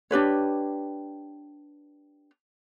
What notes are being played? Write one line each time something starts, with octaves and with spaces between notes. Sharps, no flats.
D4 G4 B4 C#5